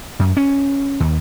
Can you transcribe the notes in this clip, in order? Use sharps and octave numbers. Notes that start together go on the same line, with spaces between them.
F#2
C#4
D#2